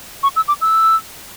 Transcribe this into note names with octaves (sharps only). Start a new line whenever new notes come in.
C#6
E6
D6
E6